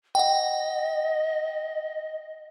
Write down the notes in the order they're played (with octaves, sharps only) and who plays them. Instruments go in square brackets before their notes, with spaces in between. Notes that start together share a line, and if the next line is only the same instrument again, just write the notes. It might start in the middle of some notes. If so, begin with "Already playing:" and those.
[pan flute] D#5 [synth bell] F#5 G5